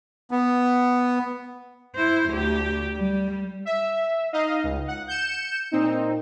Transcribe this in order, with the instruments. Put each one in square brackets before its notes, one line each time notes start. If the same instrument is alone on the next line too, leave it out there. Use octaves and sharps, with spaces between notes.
[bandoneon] B3
[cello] E4 C5
D2 G4
G3
[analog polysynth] E5
D#4 D#5 F5
C#2
F#5
G6 C#7 E7
A#2 C4 D#4